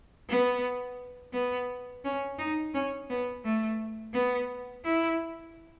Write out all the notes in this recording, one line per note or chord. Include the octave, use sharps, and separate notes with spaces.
B3
B3
C#4
D#4
C#4
B3
A3
B3
E4